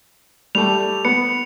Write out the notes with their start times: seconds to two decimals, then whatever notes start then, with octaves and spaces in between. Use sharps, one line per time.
0.55 G3 A3 F7
1.05 B3 C#7